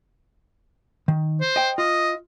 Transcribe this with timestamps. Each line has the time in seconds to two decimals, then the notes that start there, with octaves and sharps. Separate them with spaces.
1.08 D#3
1.41 C5
1.56 D#5 G5
1.78 F4 D#5